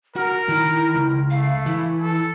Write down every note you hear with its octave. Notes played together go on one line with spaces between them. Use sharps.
F#4 A#4 F6
D#3 E4
C#2
A3 F5
E3 E4
A4